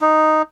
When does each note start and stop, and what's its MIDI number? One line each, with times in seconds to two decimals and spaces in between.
0.01 0.42 63